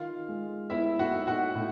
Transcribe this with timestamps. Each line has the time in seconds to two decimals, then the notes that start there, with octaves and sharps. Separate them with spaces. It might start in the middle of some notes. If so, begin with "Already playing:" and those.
Already playing: D#3 F4 F5
0.28 G#3
0.70 B3 E4 E5
0.99 F#4 F#5
1.13 D#4
1.27 F#4 F#5
1.55 A2